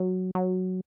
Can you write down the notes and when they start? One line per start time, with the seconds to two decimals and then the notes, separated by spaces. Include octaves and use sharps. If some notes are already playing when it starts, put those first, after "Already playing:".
Already playing: F#3
0.35 F#3